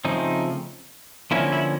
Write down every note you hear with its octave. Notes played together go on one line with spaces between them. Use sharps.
C#3 F3 A3 C4 D#4
D3 F3 A#3 C#4 E4
E4